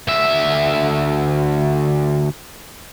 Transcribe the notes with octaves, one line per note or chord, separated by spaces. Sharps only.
D2 E5